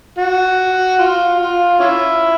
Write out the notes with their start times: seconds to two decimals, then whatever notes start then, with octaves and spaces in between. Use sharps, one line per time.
0.18 F#4
0.99 F4
1.39 F4
1.79 C#4 E4